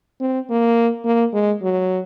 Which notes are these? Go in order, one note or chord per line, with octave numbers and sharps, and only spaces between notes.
C4
A#3
A#3
G#3
F#3